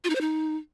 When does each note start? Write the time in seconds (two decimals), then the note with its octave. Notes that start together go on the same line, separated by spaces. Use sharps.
0.04 F4
0.10 D#4
0.15 C5
0.21 D#4